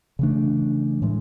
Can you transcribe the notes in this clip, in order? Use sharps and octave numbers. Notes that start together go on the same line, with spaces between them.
C#3 E3 A3 D4
A2 E3 G#3